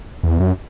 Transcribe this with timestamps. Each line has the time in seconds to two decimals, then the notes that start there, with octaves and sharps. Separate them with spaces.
0.23 E2
0.40 F#2